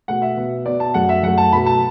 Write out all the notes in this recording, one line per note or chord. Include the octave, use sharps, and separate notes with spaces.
B2 A3 F#5
E5
B2 B3
B2 B3 D5
A5
F#2 F#3 A3 F#5
E5
F#2 F#3 A3 F#5
A5
B2 A3 B5
A5